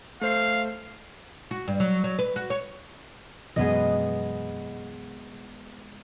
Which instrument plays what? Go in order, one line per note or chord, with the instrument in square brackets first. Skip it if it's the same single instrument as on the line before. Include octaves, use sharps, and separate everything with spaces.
[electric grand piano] A3 C5 C7 [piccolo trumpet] F5
[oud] F#4
G2
F#3
F#3
B4
F#4
C#5
[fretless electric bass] F#2 B2 E3 [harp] G#3 B3 D#5